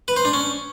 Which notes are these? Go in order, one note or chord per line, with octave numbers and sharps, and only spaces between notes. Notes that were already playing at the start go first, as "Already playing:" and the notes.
B4
C5
D4
C#4